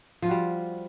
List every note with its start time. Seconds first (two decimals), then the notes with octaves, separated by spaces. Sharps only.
0.22 F3
0.25 F4
0.28 F#4
0.31 G3